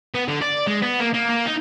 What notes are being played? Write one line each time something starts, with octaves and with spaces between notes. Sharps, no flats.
B3
D3
D5
G#3
B3
A#3
A#3
A#3
D#4